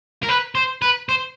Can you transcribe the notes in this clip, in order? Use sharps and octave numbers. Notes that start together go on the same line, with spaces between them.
A#4
B4
C5
B4
C5